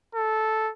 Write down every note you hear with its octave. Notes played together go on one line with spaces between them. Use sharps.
A4